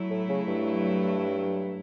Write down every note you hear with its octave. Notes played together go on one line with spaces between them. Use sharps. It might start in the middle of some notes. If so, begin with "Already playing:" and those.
Already playing: F#3 A3 E4
A2
C#3
G2